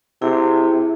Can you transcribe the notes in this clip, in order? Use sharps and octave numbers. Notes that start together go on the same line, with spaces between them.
C3 E4 G#4 E5